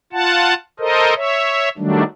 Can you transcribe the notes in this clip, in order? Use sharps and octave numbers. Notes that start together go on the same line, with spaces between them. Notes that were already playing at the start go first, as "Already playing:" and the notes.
F4 F#5 A5
A4 A#4 C5 D#5
C#5 E5
D#3 F#3 G3 A3 D4